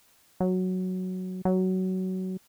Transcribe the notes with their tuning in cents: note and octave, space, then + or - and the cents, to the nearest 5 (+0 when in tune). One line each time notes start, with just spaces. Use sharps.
F#3 +0
F#3 +15